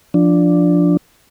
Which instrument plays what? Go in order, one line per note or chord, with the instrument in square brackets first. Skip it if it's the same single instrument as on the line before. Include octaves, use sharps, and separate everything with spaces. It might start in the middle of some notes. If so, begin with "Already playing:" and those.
[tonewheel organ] F3 D4